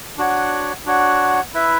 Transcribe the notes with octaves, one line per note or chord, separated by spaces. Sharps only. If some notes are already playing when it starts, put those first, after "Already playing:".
D4 F#4 C#5 F#5
D4 F#4 C#5 F#5
E4 B4 E5